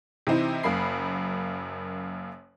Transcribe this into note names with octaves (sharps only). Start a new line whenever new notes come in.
C3 E3 C4 D#4 E4
F#1 F#2 A#3 B5 C7